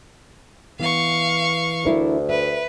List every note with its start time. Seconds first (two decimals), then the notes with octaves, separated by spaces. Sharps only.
0.80 E3 B3 F5 C#6
1.85 D2 D4 E4 A#4
2.29 B4 E5